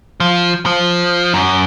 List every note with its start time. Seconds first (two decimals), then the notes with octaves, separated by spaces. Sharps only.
0.20 F3
0.66 F3
1.34 F#2